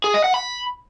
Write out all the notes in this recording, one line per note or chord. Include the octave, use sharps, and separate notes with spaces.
G#4
D#5
F#5
B5